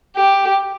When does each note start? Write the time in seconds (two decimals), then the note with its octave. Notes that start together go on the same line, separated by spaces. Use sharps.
0.17 G4